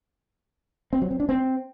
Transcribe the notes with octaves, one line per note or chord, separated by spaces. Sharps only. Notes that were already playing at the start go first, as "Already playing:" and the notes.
C4
F#3
C4
D4
C4